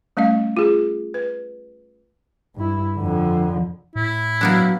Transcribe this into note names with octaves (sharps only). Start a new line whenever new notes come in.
G3 A3 C#4 D#5 F5
F4 G#4
B4
G2 E4
F2 D3
A2 E4
F#3 A#3 B3 D4